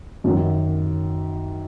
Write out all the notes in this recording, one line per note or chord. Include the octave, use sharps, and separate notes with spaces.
F#2 D#3 F#3